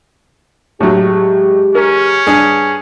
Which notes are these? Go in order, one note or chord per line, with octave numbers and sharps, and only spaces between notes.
A2 F#3 G#3 G4
C#4 A#4
G2 D4 G#4